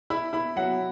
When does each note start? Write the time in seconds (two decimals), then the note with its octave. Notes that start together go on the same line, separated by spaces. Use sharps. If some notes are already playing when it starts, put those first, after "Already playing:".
0.10 E4 B5
0.33 E4 B5
0.56 F#3 F#5